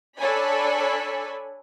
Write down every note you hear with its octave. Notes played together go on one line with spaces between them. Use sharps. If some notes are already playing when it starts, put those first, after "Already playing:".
D4 A4 C#5 D5 G#5 B5